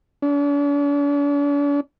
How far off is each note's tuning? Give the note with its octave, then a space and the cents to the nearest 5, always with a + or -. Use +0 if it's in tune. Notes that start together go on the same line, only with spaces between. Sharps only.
D4 -45